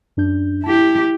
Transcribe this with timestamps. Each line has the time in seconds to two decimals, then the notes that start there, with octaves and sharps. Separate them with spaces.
0.17 F#2 D4 G6
0.64 E4 G4 A5